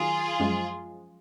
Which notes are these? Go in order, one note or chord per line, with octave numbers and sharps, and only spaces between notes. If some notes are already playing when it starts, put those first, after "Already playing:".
Already playing: D#2 D#3 F#3 F4 G#4
F#2 F3 G#3